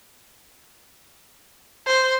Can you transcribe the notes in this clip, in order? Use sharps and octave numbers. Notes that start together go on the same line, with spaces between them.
C5